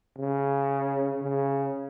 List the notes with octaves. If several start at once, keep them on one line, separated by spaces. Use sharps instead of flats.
C#3
C#3